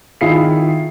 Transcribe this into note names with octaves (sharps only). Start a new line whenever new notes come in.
D#3 E4 F4 G#4 C7